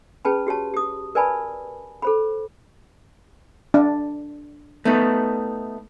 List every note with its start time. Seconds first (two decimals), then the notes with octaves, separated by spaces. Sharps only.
0.25 C#4 G#4 B4 A5 B5
0.47 F#4 G4 C#5 A5
0.74 G4 D#6
1.15 A#4 B4 D5 G#5 A5 B5
2.02 A4 C5 B5
3.74 D4
4.85 A3 B3 D#4